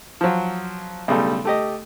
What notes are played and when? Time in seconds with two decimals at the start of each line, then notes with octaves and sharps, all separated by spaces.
0.21 F3 F#3
1.08 B1 C#3 G3 A3
1.45 A3 G4 D#5